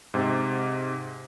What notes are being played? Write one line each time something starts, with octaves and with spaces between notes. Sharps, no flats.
G#2 C3